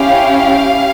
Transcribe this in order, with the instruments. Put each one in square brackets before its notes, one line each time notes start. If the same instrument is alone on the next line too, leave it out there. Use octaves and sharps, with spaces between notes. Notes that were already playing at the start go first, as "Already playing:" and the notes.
Already playing: [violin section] C#4 E4 G4 F5